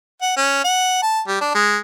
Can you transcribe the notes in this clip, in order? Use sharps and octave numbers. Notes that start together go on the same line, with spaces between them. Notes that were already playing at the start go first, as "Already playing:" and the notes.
F#5
C#4
F#5
A5
G3
D4
G#3